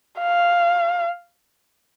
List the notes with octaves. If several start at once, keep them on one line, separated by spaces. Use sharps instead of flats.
F5